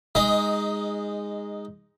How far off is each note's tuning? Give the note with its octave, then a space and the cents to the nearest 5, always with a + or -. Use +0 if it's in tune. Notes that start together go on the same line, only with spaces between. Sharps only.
G#3 -15 D#4 +0 D#5 +15